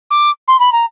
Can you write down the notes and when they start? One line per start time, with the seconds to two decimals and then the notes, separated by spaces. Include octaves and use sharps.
0.11 D6
0.48 C6
0.60 B5
0.72 A#5